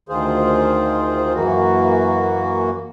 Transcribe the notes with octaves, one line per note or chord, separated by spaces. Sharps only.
D2 D#3 F4 G#4 C5
F#2 E3 A#3 F#4